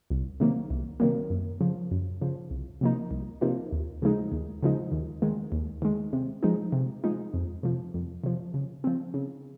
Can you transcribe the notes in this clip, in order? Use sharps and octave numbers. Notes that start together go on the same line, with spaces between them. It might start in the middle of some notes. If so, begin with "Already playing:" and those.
C2
C3 D#3 F#3 A#3
C2
C3 D#3 F#3 A#3
F#2
C#3 F3
F#2
C#3 F3
C2
C3 F3 A#3 D#4
C2
C3 F3 A#3 D#4
D#2
C#3 F3 G#3 D#4
D#2
C#3 F3 G#3 D#4
D#2
D#3 G#3
D#2
D#3 G#3
C3
F3 G#3 D#4
C3
F3 G#3 D#4
F2
C3 F3
F2
C3 F3
C#3
F3 C4
C#3